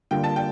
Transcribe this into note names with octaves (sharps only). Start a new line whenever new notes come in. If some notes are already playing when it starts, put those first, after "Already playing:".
D3 G3 A#3 F4 G5
A5
G5